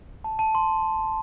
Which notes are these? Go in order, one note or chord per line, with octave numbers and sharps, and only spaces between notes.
A5
A5
C6